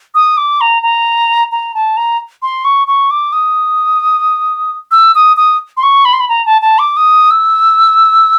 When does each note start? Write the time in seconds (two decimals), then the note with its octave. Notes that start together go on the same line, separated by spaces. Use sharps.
0.14 D#6
0.37 D6
0.61 A#5
0.82 A#5
1.52 A#5
1.74 A5
1.97 A#5
2.42 C6
2.64 C#6
2.87 C#6
3.11 D6
3.33 D#6
4.91 E6
5.15 D#6
5.37 D#6
5.77 C6
5.83 C#6
6.05 B5
6.13 C6
6.20 B5
6.29 A#5
6.46 A5
6.62 A5
6.79 D6
6.97 D#6
7.31 E6